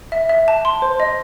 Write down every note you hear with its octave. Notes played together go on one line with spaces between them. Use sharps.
E5
E5
A5
C6
C5
D#5